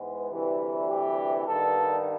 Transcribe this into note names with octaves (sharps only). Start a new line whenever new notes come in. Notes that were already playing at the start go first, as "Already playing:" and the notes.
Already playing: G#2 E3 G#3 B3
D2 C3 E3 G3
G4
G2 D#3 G3 B3 A4